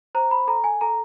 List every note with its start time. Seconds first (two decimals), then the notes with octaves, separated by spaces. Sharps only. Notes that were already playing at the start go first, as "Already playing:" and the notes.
0.15 C5 A#5
0.31 B5
0.47 A4 A#5
0.64 G#5
0.81 A4 A#5